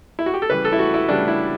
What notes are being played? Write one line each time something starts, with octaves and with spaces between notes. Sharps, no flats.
E4
F#4
G4
A4
C#3 E3 G3 B4
A4
E4
F#4
E4
C#3 E3 G3 D4
E4